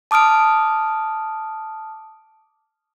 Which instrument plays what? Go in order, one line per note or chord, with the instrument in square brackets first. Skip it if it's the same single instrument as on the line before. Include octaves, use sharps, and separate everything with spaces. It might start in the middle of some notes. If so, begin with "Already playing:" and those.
[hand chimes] A5 D6 D#6 F6 D7